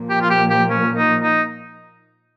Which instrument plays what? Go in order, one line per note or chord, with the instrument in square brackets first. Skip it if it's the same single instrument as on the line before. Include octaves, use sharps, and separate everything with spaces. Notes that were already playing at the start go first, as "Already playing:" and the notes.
Already playing: [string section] A#2 F3 A#3
[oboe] G4
F4
G4
G4
C#4
D#4
D#4